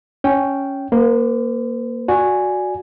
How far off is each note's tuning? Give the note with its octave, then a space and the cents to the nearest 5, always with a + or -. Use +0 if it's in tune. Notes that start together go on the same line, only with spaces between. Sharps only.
C#4 +0 G5 -5
A#3 +0 C5 -45
F#4 -10 D5 +0 G#5 +0